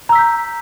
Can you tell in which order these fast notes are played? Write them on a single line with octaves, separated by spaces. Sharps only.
A#5 E6 B6 G6